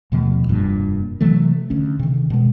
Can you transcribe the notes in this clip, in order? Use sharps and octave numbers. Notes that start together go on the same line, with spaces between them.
D#2 B2 F3 A3
F1 G2 A#2
C3 E3 F#3 A3
D2 C#4
C3 D#3
B2 G#3